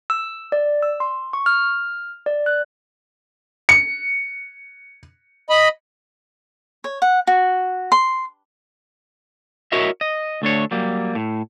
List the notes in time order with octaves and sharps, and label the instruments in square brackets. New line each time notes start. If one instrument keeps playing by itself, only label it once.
[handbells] E6
D5
E6
C6
C#6
F6
D5
F#6
[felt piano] C#7
[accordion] D#5 B5
[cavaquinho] C#5
F#5
F#4
C6
[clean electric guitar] E4 F#4 A#4 C#5 D#5 E5
D#5
D2 A3 D4 C#5
F#3 G3 A#3
A2